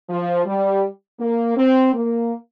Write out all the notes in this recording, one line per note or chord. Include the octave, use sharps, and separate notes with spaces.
F3
G3
A#3
C4
A#3